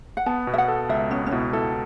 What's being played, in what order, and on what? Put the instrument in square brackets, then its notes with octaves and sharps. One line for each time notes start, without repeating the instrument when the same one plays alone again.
[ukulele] F#5
[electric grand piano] B3 [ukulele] A5
[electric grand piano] B2
[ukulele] E5
F#5
[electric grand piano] A4
[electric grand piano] C#2 [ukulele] E5
[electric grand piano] B3 [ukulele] C#4
[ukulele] C#4
[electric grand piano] B2 [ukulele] E4
[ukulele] E4 [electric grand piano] A4